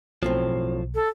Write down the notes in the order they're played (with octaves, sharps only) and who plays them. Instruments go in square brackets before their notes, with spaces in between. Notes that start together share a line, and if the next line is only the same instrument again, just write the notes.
[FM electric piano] B1 [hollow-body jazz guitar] F#2 A2 C4 [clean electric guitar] F3
[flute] A4